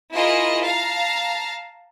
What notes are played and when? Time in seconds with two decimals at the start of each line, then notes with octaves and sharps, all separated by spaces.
0.12 E4 F4 G#4 A#4 D#5
0.62 F5 A5 A#5